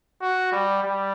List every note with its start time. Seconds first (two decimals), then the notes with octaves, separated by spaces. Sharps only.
0.22 F#4
0.52 G3
0.83 G3